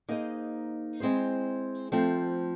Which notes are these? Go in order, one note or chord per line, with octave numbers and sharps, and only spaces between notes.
A#3 D#4 G#4 C5 D#5
G#3 C4 E4 G#4 C5
F3 A3 C4